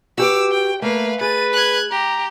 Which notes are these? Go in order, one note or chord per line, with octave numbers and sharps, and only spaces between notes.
F#4 G4 B4 D6 E6
G5
A3 A#3 B4 F5
G#4 B4 A6 D#7
F#6 G#6
G4 A#5